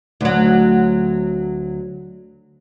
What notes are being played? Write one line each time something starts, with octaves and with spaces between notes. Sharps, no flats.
D2 F#3